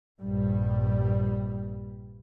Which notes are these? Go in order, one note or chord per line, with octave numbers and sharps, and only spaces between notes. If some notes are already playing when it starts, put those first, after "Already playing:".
A#1 G2 G3